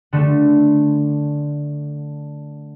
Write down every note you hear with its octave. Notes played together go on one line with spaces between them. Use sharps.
D3 A3